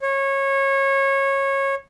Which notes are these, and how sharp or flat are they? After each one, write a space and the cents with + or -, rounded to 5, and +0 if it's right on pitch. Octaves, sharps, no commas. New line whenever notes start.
C#5 -20